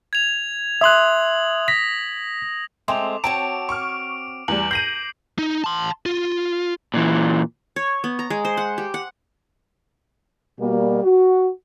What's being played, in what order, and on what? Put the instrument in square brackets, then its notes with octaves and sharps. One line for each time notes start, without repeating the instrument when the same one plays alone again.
[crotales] G#6 F7
[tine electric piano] E5 C6 F#6 [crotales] D#6 F#7
[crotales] A#6 [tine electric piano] B6
[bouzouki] G#3 A3 C4 [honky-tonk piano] C6 [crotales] D6 F7
[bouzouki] C4 F#4 C#5 [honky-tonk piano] A5 [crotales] D7
[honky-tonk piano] C#6 D6 F6
[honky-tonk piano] E2 G3 [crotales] D6 F#7
[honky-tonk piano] G6 A#6 D#7 [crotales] C7 F#7
[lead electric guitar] D#4
A5 C6
F4
[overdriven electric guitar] A#2 E3
[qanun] C#5
B3
A#5
G#3
C5
F#5
G4
F#5
[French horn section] B2 G3 A#3
F#4